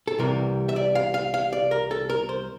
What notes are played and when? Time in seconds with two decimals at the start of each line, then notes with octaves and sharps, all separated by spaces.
0.08 A4
0.19 C2 C3 E3 G3 A#4
0.69 E5
0.76 D5
0.95 F5
1.14 F5
1.34 F5
1.53 D5
1.71 A#4
1.91 A4
2.10 A#4
2.29 C5